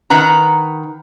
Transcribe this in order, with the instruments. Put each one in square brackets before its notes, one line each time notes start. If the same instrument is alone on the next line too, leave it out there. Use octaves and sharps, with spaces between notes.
[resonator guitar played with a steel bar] D#3 B4 F#5 A#5